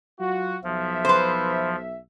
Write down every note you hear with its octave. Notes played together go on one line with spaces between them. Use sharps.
F#3 F4 F#4
B1 F3 E5
B4 C5